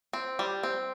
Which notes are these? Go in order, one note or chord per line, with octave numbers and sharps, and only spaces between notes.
C4
G3
C4